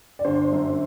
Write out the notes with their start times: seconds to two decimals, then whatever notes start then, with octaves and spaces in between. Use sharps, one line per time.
0.19 D5
0.25 G1 C5
0.52 F#2